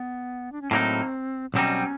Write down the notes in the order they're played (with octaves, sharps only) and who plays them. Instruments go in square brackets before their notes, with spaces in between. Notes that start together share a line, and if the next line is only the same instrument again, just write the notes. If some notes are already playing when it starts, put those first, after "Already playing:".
Already playing: [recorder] B3
D4
C#4
[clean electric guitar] A2 F#3 A#3 D#4 [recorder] C4
[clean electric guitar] B1 B2 G3 C4 D#4 [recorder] C#4